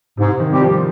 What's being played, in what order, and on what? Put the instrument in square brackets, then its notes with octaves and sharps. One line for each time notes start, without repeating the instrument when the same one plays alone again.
[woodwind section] G#2 [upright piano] C3
[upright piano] D#3
[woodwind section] G3 C4 G4
[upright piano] F3